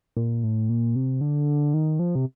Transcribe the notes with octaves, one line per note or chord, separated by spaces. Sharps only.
A#2
A2
A#2
C3
D3
D#3
F3
C3